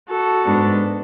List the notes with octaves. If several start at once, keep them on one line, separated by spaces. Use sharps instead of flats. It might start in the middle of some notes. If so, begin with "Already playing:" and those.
F#4 A4
G#2 G#3 B3 D4